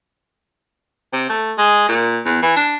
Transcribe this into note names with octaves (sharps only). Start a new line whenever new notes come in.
C3
A3
G#3
A#2
E2
E3
D4